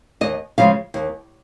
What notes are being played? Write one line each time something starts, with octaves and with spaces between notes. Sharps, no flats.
D#2 D#5
C#3 F3 G#3 F5
D#2